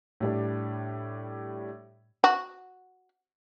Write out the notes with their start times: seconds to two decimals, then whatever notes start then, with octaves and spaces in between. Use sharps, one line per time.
0.20 A2 G3 D4
2.24 F#4